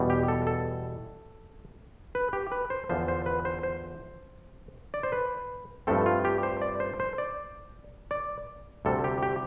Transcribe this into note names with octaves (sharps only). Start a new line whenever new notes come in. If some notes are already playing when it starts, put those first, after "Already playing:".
Already playing: E2 B2 G3
G4
A4
A4
B4
G4
B4
C5
E2 D3 F3 C5
C5
B4
C5
C5
D5
C5
B4
G2 F3 A3 C4 A4
F4
G4
C5
D5
C5
C5
D5
D5
D2 C3 G3 A4
G4
G4